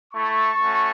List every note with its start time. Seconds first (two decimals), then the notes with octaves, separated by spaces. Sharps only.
0.14 A3 E4 A5 C#6
0.58 A3 C#4 F#4